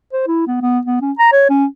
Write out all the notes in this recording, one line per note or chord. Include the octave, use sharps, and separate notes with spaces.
C5
E4
B3
B3
B3
C#4
A#5
C#5
C#4